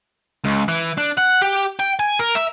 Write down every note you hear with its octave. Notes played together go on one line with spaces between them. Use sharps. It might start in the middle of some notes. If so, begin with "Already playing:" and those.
C#2
E3
D4
F#5
G4
G5
G#5
A#4
E5